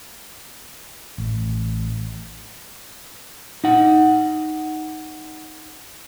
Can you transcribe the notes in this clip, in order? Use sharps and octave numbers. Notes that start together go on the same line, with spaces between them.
A1
D#4 F#5